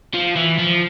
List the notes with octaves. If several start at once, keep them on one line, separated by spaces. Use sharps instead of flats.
F3
E3
F3